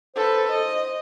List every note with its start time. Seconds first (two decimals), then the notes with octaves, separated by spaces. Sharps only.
0.16 A4 B4 C5
0.51 C5 D#5